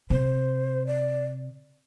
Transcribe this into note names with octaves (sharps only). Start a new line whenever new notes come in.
C3 C5
D5